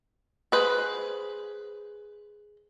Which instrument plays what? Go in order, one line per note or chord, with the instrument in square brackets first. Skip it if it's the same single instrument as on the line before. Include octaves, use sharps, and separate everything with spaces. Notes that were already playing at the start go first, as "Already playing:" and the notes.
[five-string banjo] G#4 B4 C5